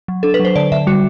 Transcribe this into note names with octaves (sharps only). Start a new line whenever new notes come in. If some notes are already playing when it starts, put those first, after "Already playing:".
F#3
D4 A4
B4
F#3
C5
D3 D5
D3 E5
G3 F#4